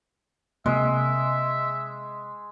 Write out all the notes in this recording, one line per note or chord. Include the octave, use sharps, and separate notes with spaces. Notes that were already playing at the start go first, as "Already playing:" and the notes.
C3 G#3 A#3 E5